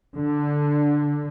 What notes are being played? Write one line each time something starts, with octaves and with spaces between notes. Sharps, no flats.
D3